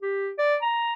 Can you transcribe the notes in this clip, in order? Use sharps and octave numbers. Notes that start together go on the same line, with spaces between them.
G4
D5
A#5